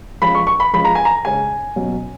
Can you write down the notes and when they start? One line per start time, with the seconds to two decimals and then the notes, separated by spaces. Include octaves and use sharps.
0.22 F3 G#3 C#4 B5
0.35 C#6
0.47 C#6
0.60 B5
0.73 F3 G#3 C#4 B5
0.85 A#5
0.95 G#5
1.05 A#5
1.25 C#3 G#3 C#4 G#5
1.76 B2 F#3 C#4